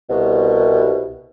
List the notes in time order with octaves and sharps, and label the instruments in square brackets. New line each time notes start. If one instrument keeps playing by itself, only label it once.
[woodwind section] C2 B2